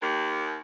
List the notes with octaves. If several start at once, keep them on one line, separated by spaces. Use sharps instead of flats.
D#2